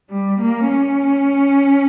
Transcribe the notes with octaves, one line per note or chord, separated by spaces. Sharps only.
G3
A#3
C#4